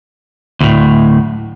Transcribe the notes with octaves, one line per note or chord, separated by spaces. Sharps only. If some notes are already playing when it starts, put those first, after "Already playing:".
D2 A2